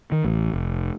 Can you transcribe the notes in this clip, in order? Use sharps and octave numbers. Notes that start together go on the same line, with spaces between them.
D#3
A1
F1